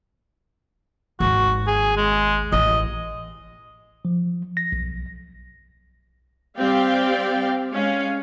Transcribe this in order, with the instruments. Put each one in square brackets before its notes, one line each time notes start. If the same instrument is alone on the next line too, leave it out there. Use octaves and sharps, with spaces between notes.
[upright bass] G#1 D#2 [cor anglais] F#4
[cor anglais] G#4
G#3
[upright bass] A1 [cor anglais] D#5
[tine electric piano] F3
A#6
B1
[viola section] G3 C4 G4 D5 F5 G5
G#3 C#4 F5